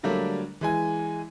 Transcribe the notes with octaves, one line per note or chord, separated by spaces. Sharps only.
D3 F#3 G3 A3 A#3 D4
E3 G#3 G#5